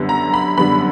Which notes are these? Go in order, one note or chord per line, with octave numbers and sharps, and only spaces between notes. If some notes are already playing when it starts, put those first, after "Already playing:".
Already playing: F#2 D3 G3 B3
A#5
B5
F#2 D3 G3 B3 B5